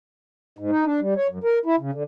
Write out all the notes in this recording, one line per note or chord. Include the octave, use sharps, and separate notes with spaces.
G#2
D#4
D4
G3
C#5
F#2
A#4
E4
C#3
D3